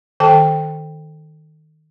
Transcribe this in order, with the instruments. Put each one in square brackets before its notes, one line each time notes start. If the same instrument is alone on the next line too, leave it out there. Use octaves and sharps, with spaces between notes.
[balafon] D#3 A4 G5 A5